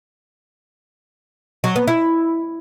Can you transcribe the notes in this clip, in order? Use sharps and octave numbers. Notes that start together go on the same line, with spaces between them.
F#3
B3
E4